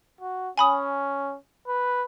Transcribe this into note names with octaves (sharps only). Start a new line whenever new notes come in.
F#4
C#4 G#5 B5 D#6
B4